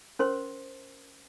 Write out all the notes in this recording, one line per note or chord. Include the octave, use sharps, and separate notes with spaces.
C#4 A#4 C5 C6